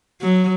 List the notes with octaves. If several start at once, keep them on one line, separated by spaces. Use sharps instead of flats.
F#3